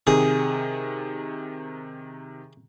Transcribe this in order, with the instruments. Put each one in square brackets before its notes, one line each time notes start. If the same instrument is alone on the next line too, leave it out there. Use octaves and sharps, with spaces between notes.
[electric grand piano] C3 D#3 [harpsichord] G#4